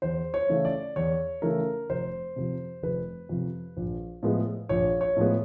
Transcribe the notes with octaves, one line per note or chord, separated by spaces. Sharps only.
E2 C5
C#5
C#3 E3 A3
D5
E2 C#5
C#3 E3 A3 A#4
F1 C5
F2 C3
F1 B4
F2 C3
A#1
A2 F3 G#3 B3
A#1 C#5
C#5
A2 F3 G#3 B3